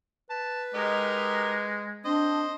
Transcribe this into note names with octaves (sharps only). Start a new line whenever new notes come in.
B4 A5
G#3 D#4 G4 A#4
C4 D4 C5 D#5